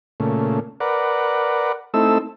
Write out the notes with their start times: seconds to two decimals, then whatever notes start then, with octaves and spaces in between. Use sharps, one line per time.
0.20 A#2 C#3 A3
0.80 A#4 B4 D5 F#5
1.94 A3 C4 D#4 E4 A4 E6